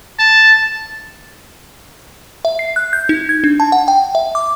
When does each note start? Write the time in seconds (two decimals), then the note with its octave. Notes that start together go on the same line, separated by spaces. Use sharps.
0.19 A5
2.45 E5
2.59 C7
2.76 F#6
2.93 G6
3.09 D#4
3.29 G#6
3.44 D4
3.60 A5
3.72 F#5
3.88 G5
4.15 E5
4.35 D6